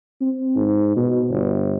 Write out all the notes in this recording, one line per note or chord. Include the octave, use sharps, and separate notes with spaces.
C4
G#2
B2
G1